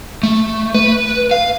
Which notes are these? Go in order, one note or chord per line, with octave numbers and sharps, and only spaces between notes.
A3
B4
F5